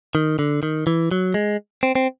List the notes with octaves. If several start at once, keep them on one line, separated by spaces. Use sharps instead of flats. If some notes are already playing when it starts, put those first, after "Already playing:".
D#3
D3
D#3
E3
F#3
G#3
C4
C4